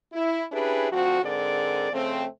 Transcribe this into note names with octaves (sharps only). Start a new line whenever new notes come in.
E4
C#4 D4 E4 G4 G#4 B4
D2 F3 C4 F#4
G#2 D3 C4 G#4 A#4 D5
F2 C#3 A3 C4